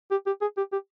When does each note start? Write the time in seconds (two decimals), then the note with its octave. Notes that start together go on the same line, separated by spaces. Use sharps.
0.11 G4
0.27 G4
0.42 G#4
0.57 G4
0.72 G4